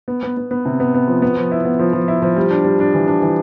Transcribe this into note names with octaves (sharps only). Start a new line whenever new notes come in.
B3
B3
B3
B3
C3
B3
B3
F3
B3
F3
E4
B3
F3
F3
E4
F3
G3
D4
G3
D4
E3
D4
E3